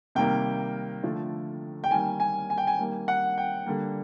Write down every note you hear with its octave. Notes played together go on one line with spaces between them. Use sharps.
C3 D#3 G3 A#3 G5
D3 F3 A3
G5
D#3 G3 A#3 G#5
G#5
G#5
G5
G#5
D#3 G3 A#3
F#5
G5
D3 G3 A#3